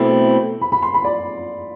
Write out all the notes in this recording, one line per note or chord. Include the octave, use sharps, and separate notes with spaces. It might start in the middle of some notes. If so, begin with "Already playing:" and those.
Already playing: B2 A3 C4 E4
B5
B5
C6
B5
D5